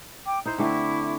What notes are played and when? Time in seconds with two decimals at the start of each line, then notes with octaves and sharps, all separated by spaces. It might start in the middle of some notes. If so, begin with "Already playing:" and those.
0.26 G5 D6
0.46 D#4 E4 C5 G6
0.58 D3 A3 C4 E4 C#6 D6